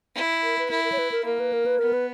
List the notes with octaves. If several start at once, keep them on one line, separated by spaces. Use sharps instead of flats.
E4
A#4
B4
E4 A#4
A#4
C#5
B4
A#4
A#3 A#4
B4
A#4
B4
B3 A#4
B4